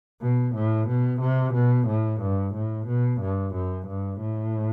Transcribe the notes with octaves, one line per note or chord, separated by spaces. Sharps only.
B2
A2
B2
C3
B2
A2
G2
A2
B2
G2
F#2
G2
A2